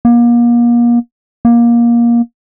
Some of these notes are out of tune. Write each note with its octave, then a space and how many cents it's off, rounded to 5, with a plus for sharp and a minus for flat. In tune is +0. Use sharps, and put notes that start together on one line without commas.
A#3 +35
A#3 +20